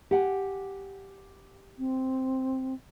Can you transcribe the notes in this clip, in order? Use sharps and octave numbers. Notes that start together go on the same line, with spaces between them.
G4 F#5 G#5
C4